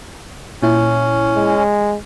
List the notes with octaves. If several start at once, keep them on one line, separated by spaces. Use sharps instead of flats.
A#2 C#4 E4
G#3